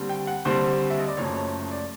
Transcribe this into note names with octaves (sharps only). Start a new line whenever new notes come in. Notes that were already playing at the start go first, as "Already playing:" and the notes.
Already playing: D#2 D3 G3 C4
G5
F#5
D#2 D3 G3 C4 C5
E5
D#5
D5
F#1 F#2 C#3 F3 A3 C#5
C#5
D5